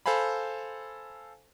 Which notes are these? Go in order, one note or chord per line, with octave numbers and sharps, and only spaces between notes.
A4 C5 F5 G#5 B5